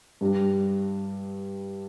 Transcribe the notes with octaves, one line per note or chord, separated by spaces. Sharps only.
G2 G3 D4